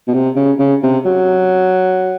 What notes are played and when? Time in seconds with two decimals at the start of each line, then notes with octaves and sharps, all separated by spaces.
0.08 B2
0.14 C3
0.36 C#3
0.59 C#3
0.83 C3
1.05 F#3